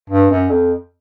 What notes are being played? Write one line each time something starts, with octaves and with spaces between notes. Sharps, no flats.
G2
F#2
F2